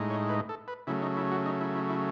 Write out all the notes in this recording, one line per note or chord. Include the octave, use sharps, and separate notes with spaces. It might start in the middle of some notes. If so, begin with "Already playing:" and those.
Already playing: A2 G#3 D#4
C#5
B4
A4
B4
C#3 F#3 A3 E4
D#4
E4
F#4
D#4
E4
E4
E4